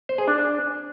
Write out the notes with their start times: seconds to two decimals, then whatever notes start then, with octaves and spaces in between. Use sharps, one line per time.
0.09 C5
0.18 G#4
0.28 D4